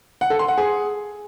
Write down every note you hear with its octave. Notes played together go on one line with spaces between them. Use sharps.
F#5
A4
C6
F#5
G#4